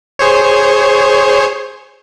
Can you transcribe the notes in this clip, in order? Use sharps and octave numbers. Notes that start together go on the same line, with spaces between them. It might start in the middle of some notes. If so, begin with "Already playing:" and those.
G#4 C5 C#5